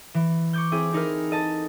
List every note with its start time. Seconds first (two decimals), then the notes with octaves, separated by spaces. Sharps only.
0.14 E3
0.53 C#6 D6 G6
0.72 C4 E4 G#4
0.93 C4 D#4 E4 A#4
1.31 A4 D#5 A5